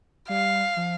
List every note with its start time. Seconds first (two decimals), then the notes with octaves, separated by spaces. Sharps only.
0.29 G3 F5
0.77 F3